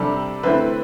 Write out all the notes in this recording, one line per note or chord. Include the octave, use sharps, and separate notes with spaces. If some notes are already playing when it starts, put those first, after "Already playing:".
Already playing: C3 G3 D4 A4
D3 A3 C4 E4 B4